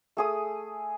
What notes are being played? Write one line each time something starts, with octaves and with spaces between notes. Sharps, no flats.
A3 G#4 D#6